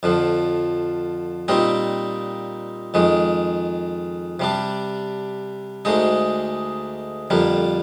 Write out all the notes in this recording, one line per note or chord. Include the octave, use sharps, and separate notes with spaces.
F2 D3 F3
A#2 G3 C4 D#4
F2 D#3 G#3
C3 G3 D4
D2 D3 G#3 D#4
F2 D3 G3 A#3